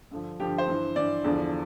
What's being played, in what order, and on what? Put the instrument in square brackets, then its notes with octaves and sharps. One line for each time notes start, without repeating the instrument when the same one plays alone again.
[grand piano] G2 D3 F3
G2 D3 F3 G4
C5
G2 E3
G2 E3 D5
E2 D3 F3